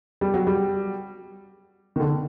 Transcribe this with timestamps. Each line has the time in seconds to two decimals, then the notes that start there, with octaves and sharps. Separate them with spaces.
0.21 G3
0.34 F#3
0.47 G3
1.96 D#3
2.00 D3